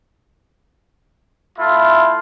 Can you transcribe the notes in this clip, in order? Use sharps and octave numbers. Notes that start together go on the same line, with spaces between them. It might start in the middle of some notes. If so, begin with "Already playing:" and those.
A3 E4 F4